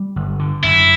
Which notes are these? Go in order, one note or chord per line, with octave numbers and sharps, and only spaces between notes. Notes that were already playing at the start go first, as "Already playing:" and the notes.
Already playing: G3
G1
D3
F#2 E4